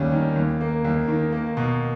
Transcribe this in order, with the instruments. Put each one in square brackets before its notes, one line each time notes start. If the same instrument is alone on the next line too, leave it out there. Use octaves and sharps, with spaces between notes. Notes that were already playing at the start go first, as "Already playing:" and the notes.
Already playing: [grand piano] D#2 G3 C#4
D#3
D#2
A#3
D#2
D#3
A#3
B2